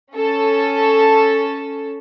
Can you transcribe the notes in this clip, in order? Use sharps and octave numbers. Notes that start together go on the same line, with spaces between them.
C#4 A4